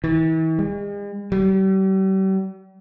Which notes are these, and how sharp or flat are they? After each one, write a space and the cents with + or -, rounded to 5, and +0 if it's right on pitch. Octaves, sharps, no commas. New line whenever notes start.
E3 -40
G#3 -45
G3 -40